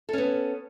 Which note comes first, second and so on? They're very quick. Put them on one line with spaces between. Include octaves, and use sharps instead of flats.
A4 C#4 B3